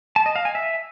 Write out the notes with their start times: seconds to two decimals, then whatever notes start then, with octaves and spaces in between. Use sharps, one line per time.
0.16 A5
0.26 D#5
0.36 F5
0.45 G#5
0.55 E5